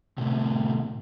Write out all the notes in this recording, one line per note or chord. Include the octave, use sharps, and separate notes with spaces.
A2 C3